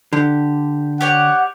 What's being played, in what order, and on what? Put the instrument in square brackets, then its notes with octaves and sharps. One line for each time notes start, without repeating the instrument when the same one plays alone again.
[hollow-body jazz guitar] D3 [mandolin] G4
[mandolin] G4 C#5 D5 [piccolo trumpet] F#5